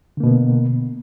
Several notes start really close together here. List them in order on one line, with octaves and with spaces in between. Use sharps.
D3 A#3 B2 B3